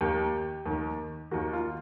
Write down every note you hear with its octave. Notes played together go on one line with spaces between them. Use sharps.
D#2 D#3 G4
D#2 D#3
D#2 D#3 F#4
F4